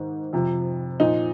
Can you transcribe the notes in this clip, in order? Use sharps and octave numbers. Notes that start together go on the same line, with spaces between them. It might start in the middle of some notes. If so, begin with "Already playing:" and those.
Already playing: G#2 D#3
F2 C3 F3
A#2 F3 D#4